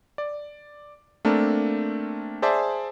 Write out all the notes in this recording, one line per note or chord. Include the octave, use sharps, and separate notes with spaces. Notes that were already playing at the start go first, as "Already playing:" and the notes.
D5
A3 A#3 C4 D4 A4 A#4
G#4 C5 D5 E5 A5